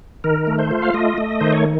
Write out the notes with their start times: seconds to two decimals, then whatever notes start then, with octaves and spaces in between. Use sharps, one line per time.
0.24 D#3 A#4
0.47 A3
0.59 C5
0.71 F4
0.82 F5
0.94 A3 D#5
1.18 A3
1.41 D#3 C5
1.52 C#5